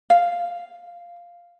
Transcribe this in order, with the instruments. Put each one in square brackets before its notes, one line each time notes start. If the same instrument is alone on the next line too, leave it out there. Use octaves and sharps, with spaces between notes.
[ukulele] F5